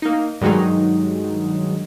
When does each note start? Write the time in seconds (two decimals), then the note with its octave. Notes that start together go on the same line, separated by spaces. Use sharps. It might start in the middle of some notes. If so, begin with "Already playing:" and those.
0.02 A#3 D#4
0.41 G2 D#3 F#3 G#3 D#4